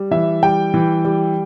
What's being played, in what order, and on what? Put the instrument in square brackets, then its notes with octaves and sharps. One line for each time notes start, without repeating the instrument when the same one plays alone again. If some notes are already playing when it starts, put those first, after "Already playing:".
Already playing: [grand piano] G3
E3 E5
G3 G5
E3
G3